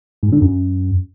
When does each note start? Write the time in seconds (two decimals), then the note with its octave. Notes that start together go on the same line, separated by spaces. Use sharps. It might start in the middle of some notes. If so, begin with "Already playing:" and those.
0.23 G#2
0.32 D3
0.42 F#2